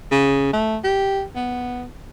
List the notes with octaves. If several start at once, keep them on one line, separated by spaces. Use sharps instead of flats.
C#3
A3
G4
B3